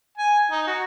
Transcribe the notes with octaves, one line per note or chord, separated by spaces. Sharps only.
G#5
D#4
F#4